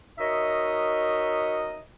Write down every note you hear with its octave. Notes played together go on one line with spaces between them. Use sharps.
D#4 F#4 A#4 C#5 D#5 E5